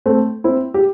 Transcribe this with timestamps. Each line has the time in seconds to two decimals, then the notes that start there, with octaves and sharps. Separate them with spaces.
0.06 A3 C4
0.44 C4 E4
0.74 G4